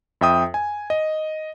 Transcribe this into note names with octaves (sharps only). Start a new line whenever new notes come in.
F2 E5 G5 D#6
G#5
D#5